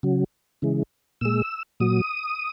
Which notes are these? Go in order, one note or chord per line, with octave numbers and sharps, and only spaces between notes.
C#3 F#3
C#3 E3 G#3
A#2 G#3 E6
A#2 F#3 D#6